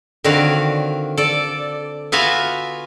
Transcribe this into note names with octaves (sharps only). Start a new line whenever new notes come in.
D3 D#3 C4 F#4 C#5 F5
A4 D5
B3 F4 F#4 E5 F5 G#5